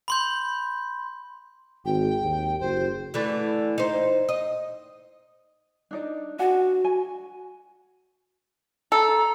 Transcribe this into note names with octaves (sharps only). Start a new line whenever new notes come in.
B5 C6 G6
G#1 G5
D#2
F#1 C5
D3 E3 A3
D#4 C5
D#5
D4 D#4 D5
D4 F#4 F#5 G#5
G#5
A4 A#5